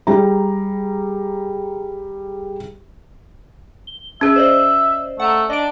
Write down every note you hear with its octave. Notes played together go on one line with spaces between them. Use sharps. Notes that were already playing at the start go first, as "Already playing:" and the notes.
G3 G#4 A#5
G7
C#4 G#4 E5
C5 D5 D#5
A3 F#5 A5 A#5
D4 D#5 D7